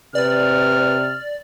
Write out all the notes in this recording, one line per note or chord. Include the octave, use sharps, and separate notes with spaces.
C3 B4 D5 F6